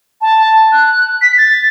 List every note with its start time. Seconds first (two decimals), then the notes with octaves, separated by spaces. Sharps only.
0.21 A5
0.72 F#6
1.22 B6
1.38 A6